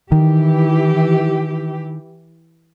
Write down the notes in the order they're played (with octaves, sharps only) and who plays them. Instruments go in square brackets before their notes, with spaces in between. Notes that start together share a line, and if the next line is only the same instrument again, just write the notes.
[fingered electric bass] D#3 [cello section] E3 G4